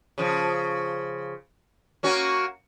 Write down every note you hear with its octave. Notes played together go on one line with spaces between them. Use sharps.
C#3 F3
A#3 C#4 F#4